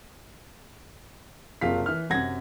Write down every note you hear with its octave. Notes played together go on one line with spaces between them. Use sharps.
F#1 C3 F4 F5 B6
E3 F6
F#2 C3 F#5 G#6 A#6